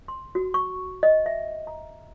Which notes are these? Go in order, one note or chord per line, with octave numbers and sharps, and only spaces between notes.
C6
F#4
C#6
D#5
E5
A#5